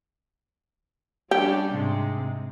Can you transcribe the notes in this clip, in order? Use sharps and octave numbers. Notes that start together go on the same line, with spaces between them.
G3 C#4 D4 G4
G#2 C3 G#3